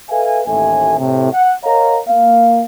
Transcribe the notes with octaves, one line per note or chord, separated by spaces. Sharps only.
A4 B4 E5 F5 G#5
A1 D#2 A2 A4 E5 G#5
A2 C3
F#5
A#4 C#5 D#5 F5 F#5 A#5
A#3 F5